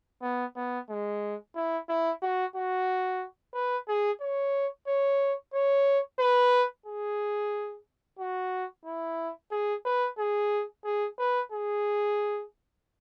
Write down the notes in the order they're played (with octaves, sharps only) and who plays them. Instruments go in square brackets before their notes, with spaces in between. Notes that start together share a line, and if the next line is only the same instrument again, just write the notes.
[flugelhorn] B3
B3
G#3
E4
E4
F#4
F#4
B4
G#4
C#5
C#5
C#5
B4
G#4
F#4
E4
G#4
B4
G#4
G#4
B4
G#4